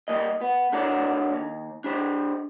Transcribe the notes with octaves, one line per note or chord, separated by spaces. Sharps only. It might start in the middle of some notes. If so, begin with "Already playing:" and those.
G3 A#3 D#5
B3
D4 F#4 A4 A#4 C#5 D5
D#2
D4 G4 C5